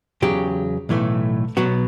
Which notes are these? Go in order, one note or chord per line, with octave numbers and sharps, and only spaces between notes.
E2 C#3 F#3 G4
B1 A2 E3 A3
B1 B2 F#3 B3 F#4